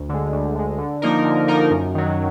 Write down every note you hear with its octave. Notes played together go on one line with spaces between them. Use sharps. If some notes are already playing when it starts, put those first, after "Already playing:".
Already playing: D2
D3 G#3
D2
D3 G#3
D3
F3 A#3 D#4 A#4
D3
F3 A#3 D#4 A#4
F#2
D#3 F#3